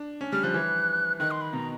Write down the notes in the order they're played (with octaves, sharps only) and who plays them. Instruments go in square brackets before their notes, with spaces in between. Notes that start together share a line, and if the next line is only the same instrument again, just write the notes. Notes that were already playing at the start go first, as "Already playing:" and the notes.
Already playing: [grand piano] D4
C#4
[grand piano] G3 [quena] F6
[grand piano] F3 [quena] F#6
[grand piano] E3
[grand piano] D#3 [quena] F#6
[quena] C6
B5
[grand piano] B2 [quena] A#5